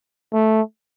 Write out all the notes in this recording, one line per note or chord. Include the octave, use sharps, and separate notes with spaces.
A3